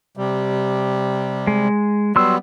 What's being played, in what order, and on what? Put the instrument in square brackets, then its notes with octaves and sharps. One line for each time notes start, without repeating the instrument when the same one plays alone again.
[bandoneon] C3 G3
[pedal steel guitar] G#3
[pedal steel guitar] F#3 C6 E6 [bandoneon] G3 B3